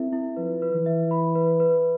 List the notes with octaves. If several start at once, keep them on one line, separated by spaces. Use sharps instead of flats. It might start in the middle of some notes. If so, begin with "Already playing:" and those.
Already playing: C4 E4 A4 E5
E4
F3 B4
B4
E3
E5
B5
B4
B4